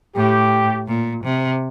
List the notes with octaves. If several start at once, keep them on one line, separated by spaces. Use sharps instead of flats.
A2 G4
A#2
C3